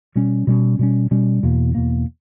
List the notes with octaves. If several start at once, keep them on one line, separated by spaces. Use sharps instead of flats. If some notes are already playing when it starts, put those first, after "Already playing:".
B2 G3 C#4
B2 G3 C#4
B2 G3 C#4
B2 G3 C#4
E2 B2 A#3
E2 B2 A#3